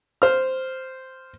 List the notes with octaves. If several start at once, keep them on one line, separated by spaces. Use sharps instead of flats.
C5 F6